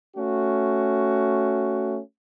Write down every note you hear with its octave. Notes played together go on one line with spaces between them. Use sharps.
A3 C#4 F#4